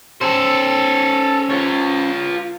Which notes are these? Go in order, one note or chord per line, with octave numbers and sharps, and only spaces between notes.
C#4 A4 C5
F4 C#5